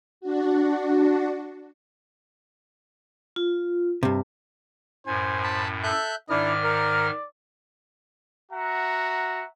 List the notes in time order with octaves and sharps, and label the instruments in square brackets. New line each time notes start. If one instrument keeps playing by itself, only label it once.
[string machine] D4 F#4
[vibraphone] F4
[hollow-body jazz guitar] G2 C3
[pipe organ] F#2 A2 [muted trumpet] C5 [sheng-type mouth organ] G#5
[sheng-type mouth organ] A5 B5
[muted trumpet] A4 [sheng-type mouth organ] E5 F#6 G6
[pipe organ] G#2 D#3 F6 [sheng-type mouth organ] D4 E4 [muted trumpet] D5
[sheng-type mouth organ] A#4
[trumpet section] F#4 E5 F#5 A#5